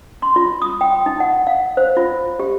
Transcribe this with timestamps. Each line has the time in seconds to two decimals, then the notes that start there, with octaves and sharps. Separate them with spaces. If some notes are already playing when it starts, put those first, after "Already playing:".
0.22 C6
0.36 F4
0.62 D#6
0.81 G5
1.06 D#4
1.20 F#5
1.47 F5
1.77 C5
1.97 F4
2.39 G4